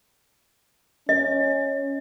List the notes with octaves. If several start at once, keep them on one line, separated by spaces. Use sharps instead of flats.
C#4 D#5